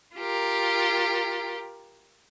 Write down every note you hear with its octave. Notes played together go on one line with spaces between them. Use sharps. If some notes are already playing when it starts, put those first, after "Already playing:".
F4 G4 A#4